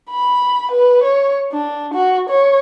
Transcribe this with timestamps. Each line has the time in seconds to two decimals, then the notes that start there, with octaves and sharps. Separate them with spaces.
0.11 B5
0.72 B4
1.04 C#5
1.52 D4
1.94 F#4
2.29 C#5